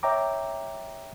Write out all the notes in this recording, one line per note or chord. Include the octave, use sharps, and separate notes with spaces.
C#5 E5 G5 A#5 D6